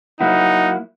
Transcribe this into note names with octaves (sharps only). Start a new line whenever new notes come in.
F#3 A#3 D#4 E4 F#5